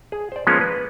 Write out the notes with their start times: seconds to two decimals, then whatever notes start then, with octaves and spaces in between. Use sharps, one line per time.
0.12 G#4
0.32 C5 D5
0.47 F3 G#3 A#3 B3 C#4
0.61 B4